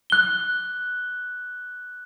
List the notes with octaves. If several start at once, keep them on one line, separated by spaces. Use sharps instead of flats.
F#6 G7